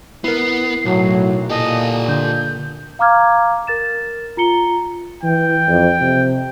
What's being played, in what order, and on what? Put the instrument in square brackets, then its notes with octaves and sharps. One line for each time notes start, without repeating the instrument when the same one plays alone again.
[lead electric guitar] B3 [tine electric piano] E4 A#4 [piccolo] C7
[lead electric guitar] B1 [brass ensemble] A2 F#3
[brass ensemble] A#2 [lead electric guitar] G4 A4 [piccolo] D#5
[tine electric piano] D3 [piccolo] G6
[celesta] F5 A#5 D6 F6 G#6
A#4 A6 E7
F4 A#5 C#7 G7
[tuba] E3 [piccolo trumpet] G5
[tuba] F2
C3